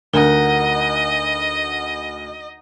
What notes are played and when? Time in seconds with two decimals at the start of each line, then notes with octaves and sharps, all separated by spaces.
0.14 D2 D#4 A#4 D#5 F#5